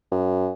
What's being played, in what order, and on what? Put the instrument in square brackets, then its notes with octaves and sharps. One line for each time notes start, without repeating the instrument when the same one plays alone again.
[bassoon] F#2